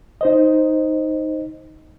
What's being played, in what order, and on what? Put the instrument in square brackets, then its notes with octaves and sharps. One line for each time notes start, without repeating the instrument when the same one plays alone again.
[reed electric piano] D#4 C5 D#5